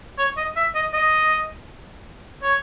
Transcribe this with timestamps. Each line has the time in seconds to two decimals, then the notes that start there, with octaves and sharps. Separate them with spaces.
0.18 C#5
0.37 D#5
0.56 E5
0.75 D#5
0.94 D#5
2.43 C#5